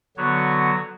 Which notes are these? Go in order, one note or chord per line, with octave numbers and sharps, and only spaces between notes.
D3 F#3 B3 F#4 C#5